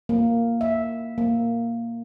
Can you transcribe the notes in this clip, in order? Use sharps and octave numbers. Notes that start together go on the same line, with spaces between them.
A#3
E5
A#3